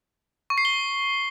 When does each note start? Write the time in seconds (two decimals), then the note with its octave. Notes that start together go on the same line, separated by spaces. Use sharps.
0.50 C#6
0.58 C7
0.65 G7